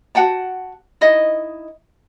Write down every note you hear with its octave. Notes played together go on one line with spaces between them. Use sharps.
F#4 F#5 G5 A5
D#4 E4 D#5 E5